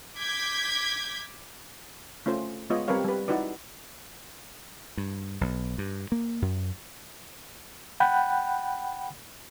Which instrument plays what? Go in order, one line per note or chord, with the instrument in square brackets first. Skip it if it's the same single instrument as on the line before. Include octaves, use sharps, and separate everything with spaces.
[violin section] D6 G6 G#6 B6
[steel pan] A3 C#4 F4 C5
G#3 B3 F4 C#5 D#5
G3 C4 A#4 B4 C#5 F5
G3 B4
D#4 E4 F#4 B4 D5
[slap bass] G2
B1
G2
A#3
F#2
[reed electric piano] F#5 G5 B5 F#6